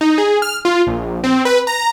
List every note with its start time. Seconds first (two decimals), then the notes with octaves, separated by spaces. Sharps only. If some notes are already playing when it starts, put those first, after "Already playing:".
0.01 D#4
0.18 G#4
0.42 F6
0.65 F4
0.87 A#1
1.24 C4
1.45 B4
1.67 A#5